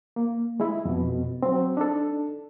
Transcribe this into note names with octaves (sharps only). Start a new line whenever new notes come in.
A#3
G#3 E4
F2 B2
F#3 C4
D4 D#4 A4